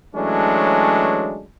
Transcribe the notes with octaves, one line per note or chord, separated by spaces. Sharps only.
E3 F#3 G#3 A3 C#4 D4